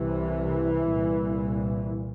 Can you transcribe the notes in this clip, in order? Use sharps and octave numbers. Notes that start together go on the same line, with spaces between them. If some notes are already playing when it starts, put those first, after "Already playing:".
Already playing: C2 C3 E3
C2 A#2